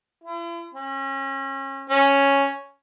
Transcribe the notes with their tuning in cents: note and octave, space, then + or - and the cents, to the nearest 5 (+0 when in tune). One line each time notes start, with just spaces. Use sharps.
E4 +45
C#4 -35
C#4 +0